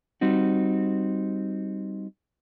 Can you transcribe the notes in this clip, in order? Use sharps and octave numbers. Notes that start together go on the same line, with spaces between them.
G3 C4 D#4 F#4